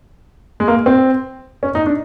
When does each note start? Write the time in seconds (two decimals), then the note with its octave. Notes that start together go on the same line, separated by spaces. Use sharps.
0.60 G#3
0.68 A#3
0.86 C4
1.63 C#4
1.75 D#4
1.86 D4